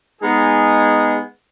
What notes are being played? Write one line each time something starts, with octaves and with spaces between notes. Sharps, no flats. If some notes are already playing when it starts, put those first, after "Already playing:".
G#3 B3 D#4 G#4